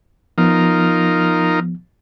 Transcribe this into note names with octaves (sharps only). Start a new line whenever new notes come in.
F3 B3 D#4 F4 A#4